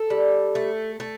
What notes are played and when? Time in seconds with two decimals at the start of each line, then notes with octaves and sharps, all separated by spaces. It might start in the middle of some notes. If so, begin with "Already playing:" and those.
Already playing: A4
0.10 G3
0.55 A3
1.00 A3